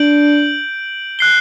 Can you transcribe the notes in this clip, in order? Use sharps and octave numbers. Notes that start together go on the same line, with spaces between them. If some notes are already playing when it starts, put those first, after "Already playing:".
Already playing: D4 G6 D7 F#7
F#6 C7 G7